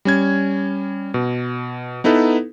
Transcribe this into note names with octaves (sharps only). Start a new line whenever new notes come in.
G3 C#4 G#6
B2
B3 D#4 E4 A4 B4